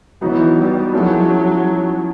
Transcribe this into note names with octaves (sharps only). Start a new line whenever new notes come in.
E3 F#3 B3 D#4 F#4
G3
F3 F#3 A#3 C#4 E4 G#4